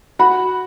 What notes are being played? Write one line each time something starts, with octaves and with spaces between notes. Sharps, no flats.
F#4 F#5 B5